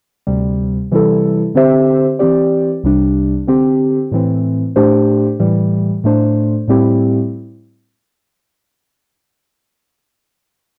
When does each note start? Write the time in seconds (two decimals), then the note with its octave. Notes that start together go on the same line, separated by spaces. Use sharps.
0.27 D2 C3 G3
0.92 C3 E3 G3 E4 A4
1.55 D3 C4 G4 C5 E5
2.19 E3 C4 G4 D5
2.84 C2 C3 G3 D4
3.47 D3 C4 G4
4.12 A2 E3 C4
4.76 A2 A3 D4 G4 C5
5.40 A2 E3 G3
6.04 A2 A3 D4 C5
6.68 A2 G3 C4 E4 G4